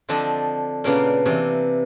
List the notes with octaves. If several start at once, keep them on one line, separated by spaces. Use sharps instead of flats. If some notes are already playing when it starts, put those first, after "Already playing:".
D3 F3 C4 D4 D#5 A5
A#2 C#3 A#3 B3 D4
C3 E3